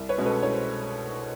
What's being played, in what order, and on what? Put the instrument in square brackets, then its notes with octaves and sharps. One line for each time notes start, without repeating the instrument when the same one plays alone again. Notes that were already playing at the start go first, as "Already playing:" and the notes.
Already playing: [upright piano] C2
B4 C#5
B2 G#3 C#4
A4 B4
C2 C#5
C5